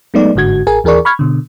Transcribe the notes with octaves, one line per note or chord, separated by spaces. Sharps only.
F#3 G#3 A3 B3 D#4 D5
G1 G#2 D3 F#4 G#6
A1 G#4 A#4 G#5
D#2 E3 G#4 A#4 D5 C#6
B5 C#6 F6 G#6
B2 D3